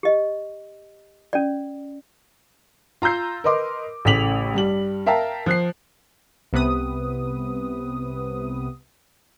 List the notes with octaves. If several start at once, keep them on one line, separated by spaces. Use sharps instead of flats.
G4 D#5
C#4 D5
F4 A#5 E6 G6 C7
A#4 B4 D#5 C6 D6
A1 A2 C#3 B6 F7 F#7
G2 G3 F#7
A#4 E5 F5 G5 A5 A#5
F3 F#6 C7
C2 C3 B3 B4 D#6